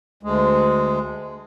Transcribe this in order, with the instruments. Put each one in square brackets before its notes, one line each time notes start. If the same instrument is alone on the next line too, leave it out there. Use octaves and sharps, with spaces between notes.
[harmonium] D2 G#3